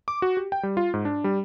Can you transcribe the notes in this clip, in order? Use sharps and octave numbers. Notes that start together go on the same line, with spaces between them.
D6
F#4
G4
G5
G3
F4
G#2
D4
G3